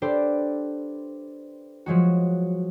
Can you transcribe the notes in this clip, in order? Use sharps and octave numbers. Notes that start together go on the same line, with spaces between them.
D4 G4 A4 B4 C5 D5
F3 F#3 G#3 F#4